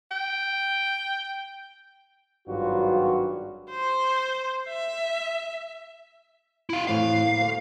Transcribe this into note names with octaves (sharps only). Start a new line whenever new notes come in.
G5
G#1 G2 F#3 F4 F#4
C5
E5
E4 F5
F2 A2 E3 F5
A#3
D2